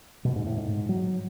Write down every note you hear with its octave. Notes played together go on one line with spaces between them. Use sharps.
B2
G#2
A2
G#2
F#3